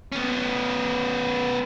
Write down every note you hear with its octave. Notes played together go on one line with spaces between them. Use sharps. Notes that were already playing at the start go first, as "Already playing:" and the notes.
B3 C#4